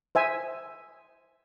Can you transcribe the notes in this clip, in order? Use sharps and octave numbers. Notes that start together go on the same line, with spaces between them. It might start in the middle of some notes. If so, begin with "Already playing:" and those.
C5 E5 G#5